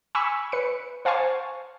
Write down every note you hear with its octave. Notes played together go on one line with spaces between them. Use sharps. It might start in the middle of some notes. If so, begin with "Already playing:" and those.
G#5 B5 C#6 E6
B4 C#7
C5 F5 G#5 A5 C#6